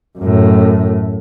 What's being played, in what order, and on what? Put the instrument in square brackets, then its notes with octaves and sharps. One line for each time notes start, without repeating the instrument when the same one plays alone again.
[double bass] F#2 A2